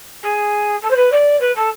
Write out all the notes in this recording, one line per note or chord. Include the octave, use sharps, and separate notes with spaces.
G#4
A4
C5
B4
D5
B4
A4